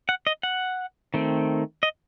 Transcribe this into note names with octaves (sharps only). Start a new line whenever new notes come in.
F#5
D#5
F#5
D#3 A3 C4
D#5